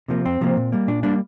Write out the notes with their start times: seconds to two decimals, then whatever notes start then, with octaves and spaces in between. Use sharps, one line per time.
0.08 C3 F3 A#3
0.25 F2 C4
0.41 C3 F3 A#3
0.57 A#2
0.72 G3 A#3
0.87 A#2 D4
1.03 G3 A#3 D4